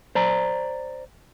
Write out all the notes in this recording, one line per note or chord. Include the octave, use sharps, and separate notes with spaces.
C5 D5 A#5